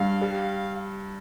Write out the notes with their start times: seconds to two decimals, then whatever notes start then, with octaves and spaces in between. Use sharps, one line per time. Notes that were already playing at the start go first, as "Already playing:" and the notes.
Already playing: G2 F5
0.21 G3